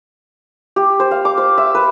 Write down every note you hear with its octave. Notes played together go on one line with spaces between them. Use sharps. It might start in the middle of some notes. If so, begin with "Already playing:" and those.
G4
C5
F5
D6
C5
E5
B4